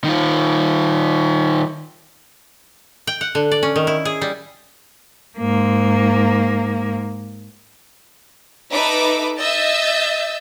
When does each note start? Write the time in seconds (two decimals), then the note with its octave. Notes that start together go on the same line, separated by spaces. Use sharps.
0.04 D#3 F4
3.07 G5
3.21 F#5
3.35 D3
3.52 D5
3.63 C#4
3.76 D#3
3.87 E4
4.05 G#4
4.21 G3
5.38 G#2 A#3
8.73 D#4 A4 B4 E5 B5 D6
9.39 D#5 E5 E6 G6 A6